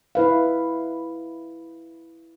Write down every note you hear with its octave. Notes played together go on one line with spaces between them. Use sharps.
E4 B4 F5